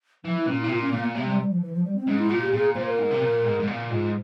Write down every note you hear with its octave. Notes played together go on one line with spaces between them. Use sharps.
E3 F3
E4
A#2 C#4
C3 E4
A#2 F4
C#4
A#2 A#3
A#3
C3 A#3
G#3
G3
G3
F3
E3
F3
G3
C4
G#2 C#4
E4
A#2 F4
G4
A#2 G#4
A#2 C5
A#4
G#2
C3
A#2
G#2
G#2
A#2
G#2 F4